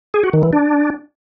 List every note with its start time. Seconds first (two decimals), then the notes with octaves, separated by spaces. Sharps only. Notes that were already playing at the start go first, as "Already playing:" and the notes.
0.14 G#4
0.24 F#4
0.33 D#3
0.43 E3
0.53 D4